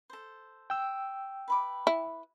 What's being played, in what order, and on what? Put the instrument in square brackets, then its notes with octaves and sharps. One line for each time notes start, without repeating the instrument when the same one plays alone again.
[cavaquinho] A4 C5
[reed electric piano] G5 E6
[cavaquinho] B4 B5 D6
[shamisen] E4